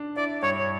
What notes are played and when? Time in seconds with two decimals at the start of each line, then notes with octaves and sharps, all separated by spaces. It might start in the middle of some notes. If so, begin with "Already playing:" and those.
Already playing: D4
0.16 E4 D5
0.43 G2 C#5